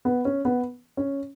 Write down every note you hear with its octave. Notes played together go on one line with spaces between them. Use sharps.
B3
C#4
B3
C#4